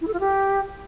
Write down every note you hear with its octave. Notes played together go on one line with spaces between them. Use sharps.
E4
A4
F4
G4